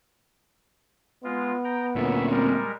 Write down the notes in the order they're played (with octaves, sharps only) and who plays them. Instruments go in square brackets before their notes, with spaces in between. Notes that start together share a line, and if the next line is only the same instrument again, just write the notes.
[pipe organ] G#3 F4 [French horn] B3
[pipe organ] G5 A#5
[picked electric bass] D2 A#2 [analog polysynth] C4 C#4 [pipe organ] E5
[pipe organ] G3 G#3 A#4